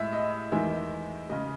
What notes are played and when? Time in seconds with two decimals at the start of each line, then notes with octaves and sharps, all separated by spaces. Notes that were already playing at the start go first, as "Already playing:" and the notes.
Already playing: A2 G#3 E5
0.13 D#5
0.52 E2 D#3 G#3 E5
1.29 C#3 G#3 D#5